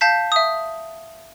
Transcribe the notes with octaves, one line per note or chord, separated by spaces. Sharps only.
F5 A5 G6 B6
E5 D#6